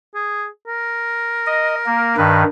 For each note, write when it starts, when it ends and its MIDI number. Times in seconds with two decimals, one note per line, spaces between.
0.15 0.47 68
0.67 2.15 70
1.46 1.75 75
1.86 2.16 58
2.17 2.44 43
2.17 2.44 51
2.17 2.44 71